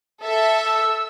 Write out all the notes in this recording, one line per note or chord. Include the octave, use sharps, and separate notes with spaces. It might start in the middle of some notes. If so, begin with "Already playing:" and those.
A4 E5
E6